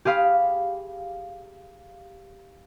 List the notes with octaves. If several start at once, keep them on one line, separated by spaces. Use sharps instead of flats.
G4 G#4 F5 B5 D#6